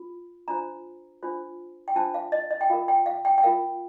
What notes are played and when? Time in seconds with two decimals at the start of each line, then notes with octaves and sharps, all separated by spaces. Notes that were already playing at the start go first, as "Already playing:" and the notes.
Already playing: F4
0.48 D4 F4 C5 A#5
1.23 D4 F4 C5
1.88 G5
1.95 D4 F4 C5 A5
2.14 F5
2.32 D#5
2.51 D#5
2.61 G5
2.70 F4 A#4 F5
2.88 G5
3.06 F5
3.25 G5
3.38 G5
3.43 F4 A#4 F5